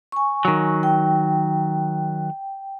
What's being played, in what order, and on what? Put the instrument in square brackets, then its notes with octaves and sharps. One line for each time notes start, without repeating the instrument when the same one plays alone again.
[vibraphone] G#5 C#6
[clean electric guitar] D#3 F#3
[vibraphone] G5